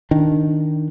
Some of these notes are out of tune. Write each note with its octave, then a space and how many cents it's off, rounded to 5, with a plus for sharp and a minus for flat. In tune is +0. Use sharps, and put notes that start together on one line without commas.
D#3 +0 D4 +0